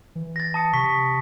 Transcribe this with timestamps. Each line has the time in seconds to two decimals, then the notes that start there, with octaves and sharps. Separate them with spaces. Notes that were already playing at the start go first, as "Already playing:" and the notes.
0.15 E3
0.36 A6 A#6
0.54 A5 D#6 C#7
0.73 C3 C#6 B6